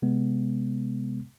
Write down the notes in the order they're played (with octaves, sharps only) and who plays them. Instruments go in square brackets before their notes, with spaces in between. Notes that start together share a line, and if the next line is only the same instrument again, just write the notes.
[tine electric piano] C3 G#3 B3